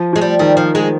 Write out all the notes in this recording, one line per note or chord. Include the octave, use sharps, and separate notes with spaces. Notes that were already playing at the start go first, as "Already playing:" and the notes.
Already playing: F3
F3 G#3
G3
D#3 G3
F3
G#3